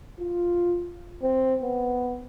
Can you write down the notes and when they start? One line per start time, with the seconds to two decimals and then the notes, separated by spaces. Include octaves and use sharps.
0.20 F4
1.22 C4
1.62 B3